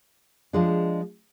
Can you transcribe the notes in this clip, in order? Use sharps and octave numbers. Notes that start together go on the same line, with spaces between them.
F3 G#3 D4